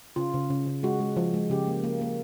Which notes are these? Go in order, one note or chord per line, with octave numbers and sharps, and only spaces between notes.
C#3 F4
C#3
C#3
C#3
G#3 F#4
G#3
F3
G#3
C#3 G4
A#3
A#3
A#3